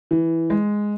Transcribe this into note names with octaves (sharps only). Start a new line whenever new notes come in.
E3
G#3